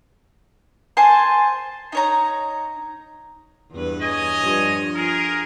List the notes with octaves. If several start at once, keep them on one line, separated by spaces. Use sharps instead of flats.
C5 G#5 A5 C6
D#4 C#5 A#5
E2 G2 B4
C#5 D#5 G#5
G2 F3 G3
F4 G#4 A#4